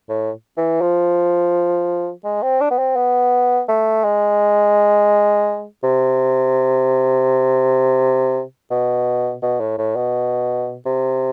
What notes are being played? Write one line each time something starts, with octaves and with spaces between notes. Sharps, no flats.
A2
E3
F3
G#3
C4
D4
B3
C4
B3
A3
G#3
C3
B2
B2
A2
A2
B2
C3